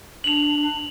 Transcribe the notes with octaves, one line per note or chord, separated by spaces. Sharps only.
D4 F7 F#7